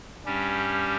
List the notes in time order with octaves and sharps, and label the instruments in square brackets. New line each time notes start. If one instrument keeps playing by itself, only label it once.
[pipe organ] G2 G3 C#4 G4